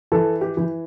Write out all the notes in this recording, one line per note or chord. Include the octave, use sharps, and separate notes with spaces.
E3 A4
G4
E3